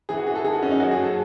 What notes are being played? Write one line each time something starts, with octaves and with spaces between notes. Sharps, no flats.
E3 G#4
F#4
E3 G#4
A4
D#3 G#4
F#4
F#2 C#4
D#4
F#3 F#4
G#4
F#3
A4